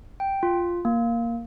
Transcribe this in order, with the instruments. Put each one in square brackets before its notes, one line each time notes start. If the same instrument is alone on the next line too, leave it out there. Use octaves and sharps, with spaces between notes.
[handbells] G5
F4
A#3